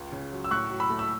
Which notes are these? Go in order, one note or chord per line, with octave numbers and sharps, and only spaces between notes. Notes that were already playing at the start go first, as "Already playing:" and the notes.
Already playing: C#2
C#3
F#3
E6
A2 C#6 F#6
F#3
B5 E6
A3
E6